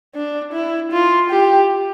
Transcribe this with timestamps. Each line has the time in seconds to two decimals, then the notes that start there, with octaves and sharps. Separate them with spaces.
0.15 D4
0.53 E4
0.92 F4
1.30 G4